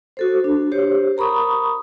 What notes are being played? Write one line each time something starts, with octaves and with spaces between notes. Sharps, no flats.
F#4 A4 C5
D4
G4 C5 C#5
A#4 A#5 B5 C#6 D#6